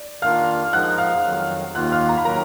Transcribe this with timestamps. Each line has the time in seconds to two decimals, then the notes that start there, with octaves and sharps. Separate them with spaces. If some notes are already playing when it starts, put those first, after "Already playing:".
Already playing: D5
0.22 D#3 A#3 D4 F4 A#4 F5 F6
0.73 F3 G#3 D#4 A#4 F#5 F#6
0.98 F5 F6
1.24 F2 D#3 F#3
1.75 D#2 D#3 A#3 F4 F#5 F#6
1.92 F5 F6
2.09 A#5
2.18 B5
2.25 D#3 F#3 A#3 A#4 A#5